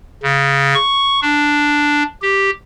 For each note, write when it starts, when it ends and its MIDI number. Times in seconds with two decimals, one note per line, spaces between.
0.23 0.74 49
0.74 1.20 85
1.22 2.03 62
2.22 2.50 67